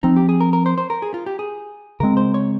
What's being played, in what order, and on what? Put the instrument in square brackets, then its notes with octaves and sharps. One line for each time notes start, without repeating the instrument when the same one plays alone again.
[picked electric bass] F3 C4 [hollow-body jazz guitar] D#4
[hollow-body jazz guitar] G4
G#4
A#4
A#4
C5
C5
A#4
G#4
F4
G4
G#4
[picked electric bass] C#3 G#3 C4 [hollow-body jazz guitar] A#4
[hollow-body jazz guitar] C5
C#5